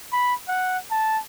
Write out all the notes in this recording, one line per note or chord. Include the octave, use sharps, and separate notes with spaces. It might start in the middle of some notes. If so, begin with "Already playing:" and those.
B5
F#5
A5